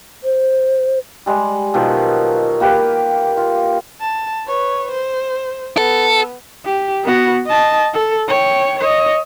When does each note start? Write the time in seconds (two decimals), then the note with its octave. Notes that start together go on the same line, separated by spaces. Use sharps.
0.24 C5
1.26 G3 G#3
1.74 B2 D#3 F3 F#3
2.36 F#4
2.60 A#3 G4 B4 G5
3.37 F4
4.01 A5
4.46 B4 C#5
4.92 C5
5.78 B3 A4
6.65 G4
7.03 B3 F#4
7.47 D#5 A5
7.94 A4
8.28 C#5 G5
8.79 C#5 D#5